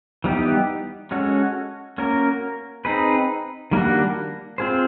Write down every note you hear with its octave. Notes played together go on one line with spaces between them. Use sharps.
E3 G3 B3 D#4 G4
G#3 C#4 F#4 A4 C#5
A#3 C#4 F#4 A#4
C4 D#4 G#4 B4
D#3 G3 A#3 D4 F#4
C4 F4 G#4 C5